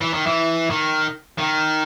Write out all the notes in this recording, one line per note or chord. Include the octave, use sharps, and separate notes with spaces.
E3
D#3
E3
D#3
D#3